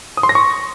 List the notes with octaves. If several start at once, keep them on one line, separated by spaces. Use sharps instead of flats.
D#6
C6
A#6
C#6